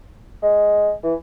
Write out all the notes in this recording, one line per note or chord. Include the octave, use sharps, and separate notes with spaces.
G#3
E3